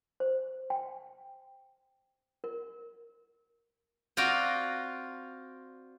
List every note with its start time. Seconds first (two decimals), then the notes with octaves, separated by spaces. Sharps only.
0.20 C5
0.70 G5
2.44 A#4
4.17 C4 F4 F#4 D5 G5 A#5